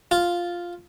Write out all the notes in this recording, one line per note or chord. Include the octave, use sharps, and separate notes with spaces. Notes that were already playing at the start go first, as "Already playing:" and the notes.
F4